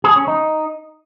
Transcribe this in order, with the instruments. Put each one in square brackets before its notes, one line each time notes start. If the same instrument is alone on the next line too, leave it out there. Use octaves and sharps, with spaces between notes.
[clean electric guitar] G#4
C#4
D#4